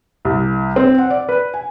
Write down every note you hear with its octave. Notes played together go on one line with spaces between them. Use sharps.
C2
C4
F#5
D5
B4
G#5